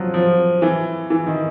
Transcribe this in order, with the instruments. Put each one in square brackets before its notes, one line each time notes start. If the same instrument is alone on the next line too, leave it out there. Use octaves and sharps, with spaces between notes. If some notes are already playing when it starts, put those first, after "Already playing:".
Already playing: [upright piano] F3 F#3
F3
E3
E3
D#3